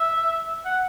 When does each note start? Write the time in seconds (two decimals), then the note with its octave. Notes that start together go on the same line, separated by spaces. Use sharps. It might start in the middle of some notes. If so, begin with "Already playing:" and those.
Already playing: E5
0.65 F#5